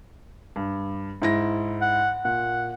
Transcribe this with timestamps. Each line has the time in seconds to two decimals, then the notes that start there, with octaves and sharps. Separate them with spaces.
0.56 G2
1.22 G#2 E4 A#6
1.82 F#5
2.25 A#2 F#5